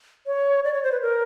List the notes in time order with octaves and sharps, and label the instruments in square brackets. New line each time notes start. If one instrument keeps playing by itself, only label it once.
[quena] C#5
D5
C#5
C5
B4
A#4